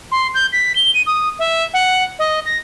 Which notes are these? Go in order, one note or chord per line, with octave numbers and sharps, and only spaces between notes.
C6
G6
B6
G7
D#7
D#6
E5
F#5
D#5
A#6